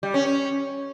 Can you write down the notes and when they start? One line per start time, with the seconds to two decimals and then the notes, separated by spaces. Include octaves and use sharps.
0.03 G3
0.14 C#4
0.25 C#4